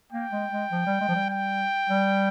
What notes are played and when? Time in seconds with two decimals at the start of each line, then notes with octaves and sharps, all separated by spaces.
0.12 A#3 G5
0.32 G#3
0.52 G#3
0.72 F3
0.86 G3
1.00 G#3
1.08 F3
1.15 G3
1.30 G5
1.89 G3